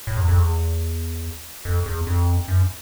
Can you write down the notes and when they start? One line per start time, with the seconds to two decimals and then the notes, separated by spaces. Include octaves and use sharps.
0.07 A2
0.17 E2
0.28 F2
0.38 E2
1.65 F2
1.86 E2
2.07 F2
2.48 F#2